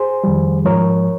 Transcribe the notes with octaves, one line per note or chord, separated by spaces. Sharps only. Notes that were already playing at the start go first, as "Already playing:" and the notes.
Already playing: G#4 C5
F2 D#3 G3
G#2 F3 A#4 C#5